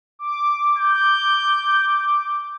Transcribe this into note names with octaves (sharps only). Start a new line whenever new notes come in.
D6
G6